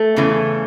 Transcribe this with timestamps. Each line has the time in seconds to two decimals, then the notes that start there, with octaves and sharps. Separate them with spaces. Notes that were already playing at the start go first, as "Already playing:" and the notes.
Already playing: A3
0.16 E2 C#3 E3